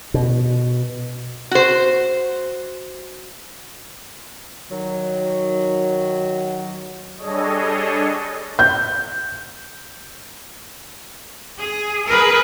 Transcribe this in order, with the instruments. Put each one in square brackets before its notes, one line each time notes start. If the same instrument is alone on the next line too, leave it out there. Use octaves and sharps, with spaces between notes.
[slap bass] B2
[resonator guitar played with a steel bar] F#4 C5
[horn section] D#3 F#3
[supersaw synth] G3 D4 G#4 A4 C#5 D#5
[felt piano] G6
[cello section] G#4
G#4 A#4 B4